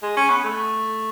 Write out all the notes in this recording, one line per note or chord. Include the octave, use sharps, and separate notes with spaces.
G#3
C#4
B3
A3